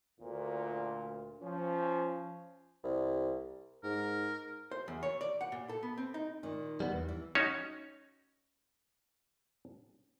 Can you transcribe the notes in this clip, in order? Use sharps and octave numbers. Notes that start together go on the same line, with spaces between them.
D2 A#2
F3 C#4
C2
G#2 A#4
C5
E2
C#5
D5
F#5
A#2
A4
B3
C4
D#4
A#2 D#3
G3 B3
E2
E3
C#4 D#4 F#4 C#5